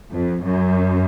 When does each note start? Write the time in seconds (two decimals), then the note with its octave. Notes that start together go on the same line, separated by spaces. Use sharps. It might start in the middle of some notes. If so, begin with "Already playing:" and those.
0.13 F2
0.44 F#2